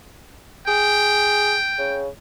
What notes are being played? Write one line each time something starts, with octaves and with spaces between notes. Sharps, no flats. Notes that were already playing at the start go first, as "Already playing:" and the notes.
G#4 G5
C#3